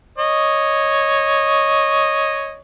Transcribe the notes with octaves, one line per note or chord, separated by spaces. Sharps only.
C#5 D#5